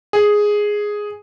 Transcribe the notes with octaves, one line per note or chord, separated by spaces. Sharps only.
G#4